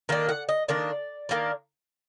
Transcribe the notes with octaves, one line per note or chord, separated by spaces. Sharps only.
D#3 A#3 D4
F#5
D#5
D#3 A#3 D4 D5
D#3 A#3 D4